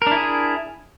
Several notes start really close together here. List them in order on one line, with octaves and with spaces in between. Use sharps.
A#4 D4 E4 G#4